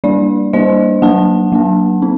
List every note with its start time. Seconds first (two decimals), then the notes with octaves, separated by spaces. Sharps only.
0.04 G3 A#3 D4 D5
0.53 G3 A#3 D4 C5 D#5
1.02 F#3 A#3 D4 F#5 A5
1.52 F#3 A#3 D4
2.02 C4 D#4